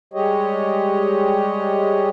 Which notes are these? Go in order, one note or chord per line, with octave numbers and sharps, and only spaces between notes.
G3 G#3 G4 C#5 D#5